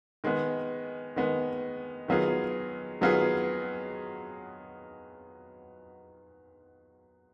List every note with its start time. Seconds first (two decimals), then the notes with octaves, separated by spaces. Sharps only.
0.24 D#3 G#3 B3
1.16 D#3 G#3 B3
2.08 D#3 F#3 B3 F4 G#4
3.01 D#3 F#3 B3 F4 G#4